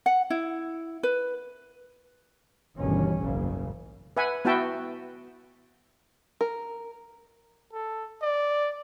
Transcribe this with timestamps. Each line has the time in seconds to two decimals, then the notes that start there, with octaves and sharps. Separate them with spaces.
0.06 F#5
0.30 E4
1.03 B4
2.76 G1 B2 D#3 E3 C#4
3.20 F#1 B1 G#2 C#3
4.17 B4 E5 F#5 G#5
4.45 B3 E4 F#4 E5 G5 A5
6.41 A#4
7.73 A4
8.22 D5